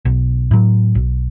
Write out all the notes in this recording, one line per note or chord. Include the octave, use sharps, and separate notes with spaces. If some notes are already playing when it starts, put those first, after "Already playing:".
B1
A2 F#3
B1